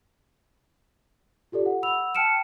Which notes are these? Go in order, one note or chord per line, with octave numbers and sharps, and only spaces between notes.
F4 G4 A4 D5
F#5
F#5 B5 E6 F7
G5 A5 F6 C#7 D7 E7